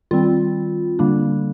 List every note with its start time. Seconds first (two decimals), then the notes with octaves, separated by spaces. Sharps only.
0.11 D#3 G3 C4 F4
0.99 D3 G3 A#3 D4